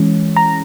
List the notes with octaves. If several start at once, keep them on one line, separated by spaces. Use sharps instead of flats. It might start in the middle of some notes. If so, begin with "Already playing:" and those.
Already playing: E3 G#3 C#4
A#5